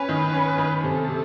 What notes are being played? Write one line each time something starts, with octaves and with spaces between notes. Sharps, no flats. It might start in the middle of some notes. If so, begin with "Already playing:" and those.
Already playing: C#4 B4
D#3
C#4
D#3
C3 A4
C3